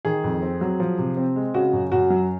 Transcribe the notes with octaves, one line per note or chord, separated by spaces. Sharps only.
D#3 G#4
F2
C4
F#3
F3
C3
C4
G#3
C#3 F#4
F#2
F#2 F#4
F#3